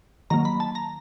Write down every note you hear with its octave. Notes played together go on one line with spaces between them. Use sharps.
D#3 F#3 A#3 A#5
B5
A5
A#5